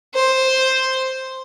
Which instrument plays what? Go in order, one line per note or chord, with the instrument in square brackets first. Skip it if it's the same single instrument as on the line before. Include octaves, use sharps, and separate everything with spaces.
[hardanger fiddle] C5